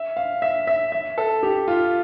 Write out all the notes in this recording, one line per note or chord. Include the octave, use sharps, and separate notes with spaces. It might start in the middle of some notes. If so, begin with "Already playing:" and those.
Already playing: E5
F5
E5
E5
E5
A4
G4
F4